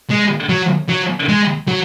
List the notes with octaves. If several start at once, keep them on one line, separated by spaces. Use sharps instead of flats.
G#3
F#3
F#3
G#3
F#3